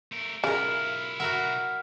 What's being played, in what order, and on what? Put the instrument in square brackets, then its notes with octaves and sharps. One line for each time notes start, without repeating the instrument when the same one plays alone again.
[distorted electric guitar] A3 A#4
[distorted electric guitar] B1 E4 [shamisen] C#3 [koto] F4 A#4 [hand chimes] F6
[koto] F#4 A#4 E5 [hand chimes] F#5 F6